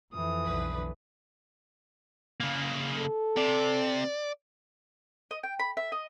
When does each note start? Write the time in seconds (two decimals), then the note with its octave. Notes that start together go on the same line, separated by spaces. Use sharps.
0.13 F2 E3 D#6
0.45 B1 D3 B4
2.40 C#3 A#3
2.98 A4
3.37 C3 D5
5.31 D#5
5.43 G5
5.59 B5
5.77 E5
5.92 D#5